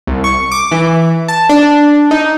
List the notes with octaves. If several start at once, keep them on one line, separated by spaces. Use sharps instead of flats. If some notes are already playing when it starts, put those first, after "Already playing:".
C2
C#6
D6
E3
A5
D4
D#4